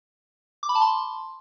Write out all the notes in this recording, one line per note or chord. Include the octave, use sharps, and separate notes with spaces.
D6
B5
A5
C6